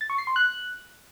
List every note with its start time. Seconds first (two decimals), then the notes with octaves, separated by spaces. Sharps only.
0.01 A6
0.10 C#6
0.18 C7
0.27 C6
0.36 F#6